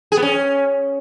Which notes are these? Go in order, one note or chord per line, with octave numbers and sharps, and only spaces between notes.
G#4
B3
C#4